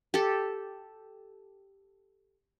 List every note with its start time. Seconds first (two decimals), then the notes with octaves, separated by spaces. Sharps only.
0.14 G4 A4